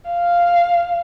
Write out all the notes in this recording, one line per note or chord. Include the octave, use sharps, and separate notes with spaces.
F5